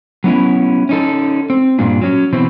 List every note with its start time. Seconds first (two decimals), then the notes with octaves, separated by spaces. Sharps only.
0.24 F#3 B3 C#4 E4
0.89 C#4 D#4 A4
1.50 C4
1.79 G2 A#2 D4
2.01 F#3 C#4
2.33 B2 E3 C4